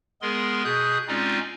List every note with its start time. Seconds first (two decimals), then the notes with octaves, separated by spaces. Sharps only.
0.22 G#3 B3 G#4 A#4 C6
0.64 B2 G#4 D#6 F#6 G6
1.08 G#3 C4 C#4 D#4 F4 D5